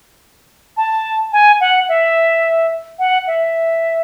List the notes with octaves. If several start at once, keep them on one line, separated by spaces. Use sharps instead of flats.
A5
G#5
F#5
E5
F#5
E5